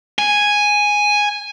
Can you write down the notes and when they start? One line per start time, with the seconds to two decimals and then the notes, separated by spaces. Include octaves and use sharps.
0.19 G#5